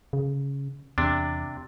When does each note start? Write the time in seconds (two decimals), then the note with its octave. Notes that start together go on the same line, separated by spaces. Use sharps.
0.13 C#3
0.98 E2 C3 D4